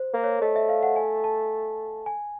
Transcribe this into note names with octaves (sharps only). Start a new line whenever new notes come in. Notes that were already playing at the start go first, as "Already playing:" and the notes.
Already playing: C5
A#3
C#5
A3 D#5
E5
F5
F#5
G#5
A5
G#5